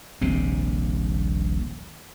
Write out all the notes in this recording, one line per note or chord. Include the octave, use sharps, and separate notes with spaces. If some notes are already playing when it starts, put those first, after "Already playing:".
D#1 A#1 C3 C4